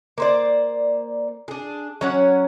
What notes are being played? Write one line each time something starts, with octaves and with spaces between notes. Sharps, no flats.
A#3 C5 D5
D4 G#4
F#3 C#4 F#5